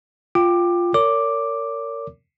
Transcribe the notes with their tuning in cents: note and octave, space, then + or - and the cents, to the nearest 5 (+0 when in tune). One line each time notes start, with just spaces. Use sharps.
F4 +0 G5 +0 D6 +15
A#4 -30 C#5 +40 D6 +0